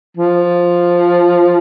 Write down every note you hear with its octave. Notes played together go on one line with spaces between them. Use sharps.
F3